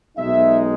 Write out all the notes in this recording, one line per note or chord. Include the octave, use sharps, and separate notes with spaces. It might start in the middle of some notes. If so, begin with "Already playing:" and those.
B1 B2 G#3 D#4 E5